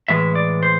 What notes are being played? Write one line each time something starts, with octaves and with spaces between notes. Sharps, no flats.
A2 E3 G#3 E5
D5
C5